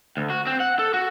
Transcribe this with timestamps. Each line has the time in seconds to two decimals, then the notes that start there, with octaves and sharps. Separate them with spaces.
0.17 D2
0.30 F#4
0.47 C4
0.60 F#5
0.79 A4
0.94 F#4